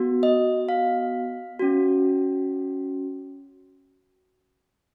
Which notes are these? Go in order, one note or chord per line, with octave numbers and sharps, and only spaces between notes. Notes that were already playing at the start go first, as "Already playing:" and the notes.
Already playing: B3 F#4
D#5
F5
C#4 F#4